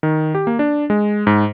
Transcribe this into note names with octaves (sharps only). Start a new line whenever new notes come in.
D#3
G4
A#3
D4
G#3
G#2